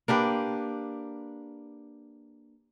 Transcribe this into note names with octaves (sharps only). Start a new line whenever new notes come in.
A#3 D4 G4 B4